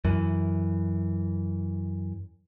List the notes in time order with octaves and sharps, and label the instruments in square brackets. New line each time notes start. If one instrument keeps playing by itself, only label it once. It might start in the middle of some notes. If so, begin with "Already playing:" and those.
[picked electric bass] F#2 E3